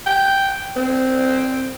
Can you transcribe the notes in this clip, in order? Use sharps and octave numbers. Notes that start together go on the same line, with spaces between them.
G5
C4